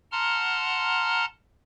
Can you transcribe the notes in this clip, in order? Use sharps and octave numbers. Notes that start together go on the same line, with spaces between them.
F#5 A5 A#5 C6 F6